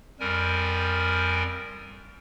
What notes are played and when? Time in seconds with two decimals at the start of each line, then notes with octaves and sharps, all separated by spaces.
0.20 F2 G3 A#4 G#5